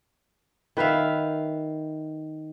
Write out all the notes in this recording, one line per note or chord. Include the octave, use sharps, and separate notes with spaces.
D#3 B4 E5 F5